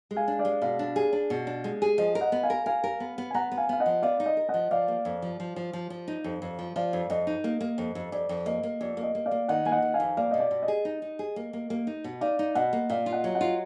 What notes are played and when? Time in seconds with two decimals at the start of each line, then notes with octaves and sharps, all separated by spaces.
0.11 G#3
0.16 F5 G#5
0.28 D4
0.39 D5 F5
0.45 G#3
0.62 B2 D5 F5
0.79 D4
0.96 G#4
1.13 D4
1.30 B2
1.47 D4
1.64 G#3
1.82 G#4
1.98 F3 D#5
2.15 A#4
2.21 D#5 F#5
2.32 B3
2.43 F5 G#5
2.50 A#4
2.66 A#4 F5 G#5
2.84 A#4
3.00 B3
3.18 B3
3.31 G#5
3.34 B3 F#5 A#5
3.52 B3
3.57 F5 G#5
3.69 B3 F5
3.80 D#5 F#5
3.86 F3
4.02 B3 D5 F5
4.20 D#4
4.26 D#5
4.37 A#4
4.49 D#5 F#5
4.54 F3
4.71 F3 D5 F5
4.88 A#3
5.05 F2
5.22 F3
5.40 F3
5.56 F3
5.73 F3
5.90 F3
6.08 D#4
6.24 F2
6.42 F2
6.59 F3
6.76 F3 D5 F5
6.93 F2
7.10 F2 D#5
7.27 D#4
7.44 A#3
7.61 A#3
7.78 F2
7.95 F2
8.12 F2 D5
8.29 F2
8.46 A#3 D#5
8.63 A#3
8.80 F2 D5
8.97 A#3
9.03 D#5
9.15 A#3
9.26 D5 F5
9.31 A#3
9.48 D#3 D#5 F#5
9.65 A#3 G#5
9.71 D#5 F#5
9.82 D#3
9.94 F5 G#5
10.00 F2
10.17 A#3 D5 F5
10.31 B2 D#5
10.40 D5
10.51 B2
10.63 D#5
10.68 G#4
10.85 D#4
11.02 D#4
11.19 G#4
11.36 A#3
11.53 A#3
11.70 A#3
11.87 D#4
12.04 B2
12.21 D#4 D5 F5
12.39 D#4
12.55 B2 D#5 F#5
12.73 A#3
12.90 A#2 D5 F5
13.06 F4
13.12 D#5 F#5
13.24 F#3
13.35 D#5 F#5
13.41 F4